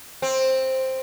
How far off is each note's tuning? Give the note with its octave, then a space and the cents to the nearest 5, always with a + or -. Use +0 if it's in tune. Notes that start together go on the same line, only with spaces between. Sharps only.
C4 +5